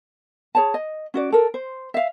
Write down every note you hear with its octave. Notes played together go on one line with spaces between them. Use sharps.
G#4 C#5 A5
D#5
C#4 F#4 D5
A4 A#4
C5
E5 F5